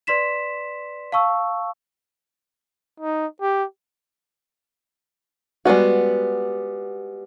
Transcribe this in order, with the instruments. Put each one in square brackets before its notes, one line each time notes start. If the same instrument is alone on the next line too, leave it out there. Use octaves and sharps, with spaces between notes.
[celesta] B4 D5 C6 B6 E7
F5 A5 C#6 E6
[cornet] D#4
G4
[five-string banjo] G3 G#3 B3 F#4